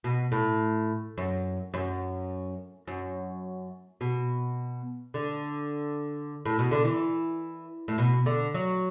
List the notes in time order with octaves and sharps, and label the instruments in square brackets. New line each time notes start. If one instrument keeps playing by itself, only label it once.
[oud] B2
A2
F#2
F#2
F#2
B2
D3
A2
B2
D3
E3
A2
B2
D3
F#3